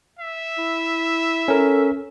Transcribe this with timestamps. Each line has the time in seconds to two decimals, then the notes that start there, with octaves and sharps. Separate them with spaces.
0.19 E5
0.58 E4
1.48 C#4 A4 A#4